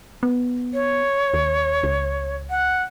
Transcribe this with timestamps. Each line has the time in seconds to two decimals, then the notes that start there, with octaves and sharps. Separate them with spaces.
0.23 B3
0.74 C#5
1.34 D#2
1.83 C#2
2.50 F#5